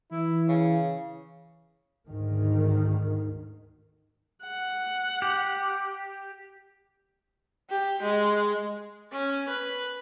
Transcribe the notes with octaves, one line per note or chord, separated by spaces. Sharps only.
E3 E4
C#3
D2 G#2 D#3
F#5
G4
G4
G#3
C#4
B4